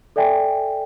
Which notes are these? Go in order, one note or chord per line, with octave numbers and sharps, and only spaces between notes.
A4 D5 E5 G5 G#5